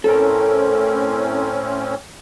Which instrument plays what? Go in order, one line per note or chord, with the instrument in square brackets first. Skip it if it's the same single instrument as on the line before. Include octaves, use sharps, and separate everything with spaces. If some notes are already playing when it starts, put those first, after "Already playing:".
[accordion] A2 C4 C#4 [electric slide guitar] A4 A#4